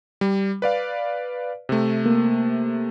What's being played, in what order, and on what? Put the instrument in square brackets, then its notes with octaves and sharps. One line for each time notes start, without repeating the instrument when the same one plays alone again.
[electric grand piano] G3
B4 D5 F5
C3 A3
[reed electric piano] A#3